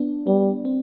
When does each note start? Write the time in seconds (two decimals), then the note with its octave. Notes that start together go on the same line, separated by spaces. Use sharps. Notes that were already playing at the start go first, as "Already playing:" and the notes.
Already playing: B3 D4
0.27 G3 B3
0.65 C4